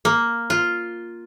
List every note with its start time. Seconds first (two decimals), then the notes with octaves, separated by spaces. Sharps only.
0.05 A#3
0.50 F4